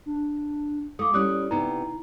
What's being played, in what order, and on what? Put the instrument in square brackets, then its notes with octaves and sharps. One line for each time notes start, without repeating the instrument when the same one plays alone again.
[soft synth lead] D4
[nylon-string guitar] A3 [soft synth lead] F5 [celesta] D6 D#6
[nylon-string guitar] G3 C#4 [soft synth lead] E4 [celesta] D#6 F#6
[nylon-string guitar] C3 B3 [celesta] D#4 A#5